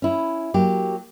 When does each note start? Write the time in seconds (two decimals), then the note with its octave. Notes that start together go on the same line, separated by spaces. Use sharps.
0.02 C#4 E4
0.54 F#3 A#3 G4